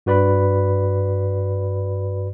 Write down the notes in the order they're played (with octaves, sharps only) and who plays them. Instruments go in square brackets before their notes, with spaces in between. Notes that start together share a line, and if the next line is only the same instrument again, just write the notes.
[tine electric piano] G2 F#4 B4 D5 B5